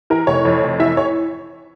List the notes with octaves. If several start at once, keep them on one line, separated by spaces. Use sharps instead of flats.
E3 A#4
F1 C#5
F2
F1
E3 E5
C#5